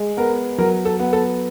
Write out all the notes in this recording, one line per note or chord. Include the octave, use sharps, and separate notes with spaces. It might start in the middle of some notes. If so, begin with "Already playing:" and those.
Already playing: G#3
B3 A#4
F#3 A#4
A4
B3
A4